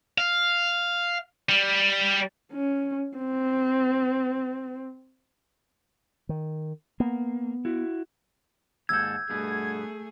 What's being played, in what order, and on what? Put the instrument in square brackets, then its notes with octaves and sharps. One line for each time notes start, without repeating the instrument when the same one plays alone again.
[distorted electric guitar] F5
G3
[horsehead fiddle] C#4
C4
[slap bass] D#3
[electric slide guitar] A#3 [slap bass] B3
[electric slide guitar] E4 F#4
[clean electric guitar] D#2 G#2 A4 [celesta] E6 G6 [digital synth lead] G#6
[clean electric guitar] G2 B2 B3 [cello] A3 G#4